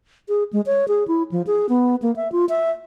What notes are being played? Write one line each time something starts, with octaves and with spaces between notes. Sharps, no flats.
G#4
G#3
C#5
G#4
E4
F3
G#4
B3
A#3
E5
F4
E5